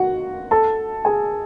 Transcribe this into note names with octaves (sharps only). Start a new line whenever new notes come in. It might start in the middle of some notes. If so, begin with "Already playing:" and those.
Already playing: F#4 F#5
A4 A5
G#4 G#5